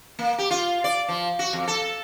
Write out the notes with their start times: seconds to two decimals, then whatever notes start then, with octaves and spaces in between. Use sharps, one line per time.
0.19 A#3
0.38 G4
0.51 F4
0.84 D5
1.08 F3
1.39 F#4
1.53 F2
1.68 A4